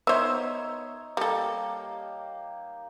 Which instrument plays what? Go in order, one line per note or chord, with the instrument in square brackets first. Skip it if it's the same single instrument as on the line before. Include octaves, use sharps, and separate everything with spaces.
[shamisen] B3 C5 [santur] D#4 C#5 [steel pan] E5 E6
[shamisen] G3 A4 [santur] A#3 G4